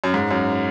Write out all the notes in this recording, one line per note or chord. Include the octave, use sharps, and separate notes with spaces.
F#2
G#2
F#2